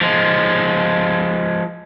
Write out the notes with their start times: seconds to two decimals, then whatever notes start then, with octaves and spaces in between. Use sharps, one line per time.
0.01 F3 G#3